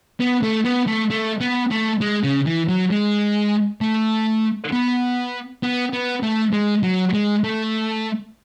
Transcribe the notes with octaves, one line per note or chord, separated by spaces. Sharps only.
B3
A3
B3
A3
A3
B3
A3
G#3
C#3
E3
F#3
G#3
A3
B3
B3
B3
A3
G#3
F#3
G#3
A3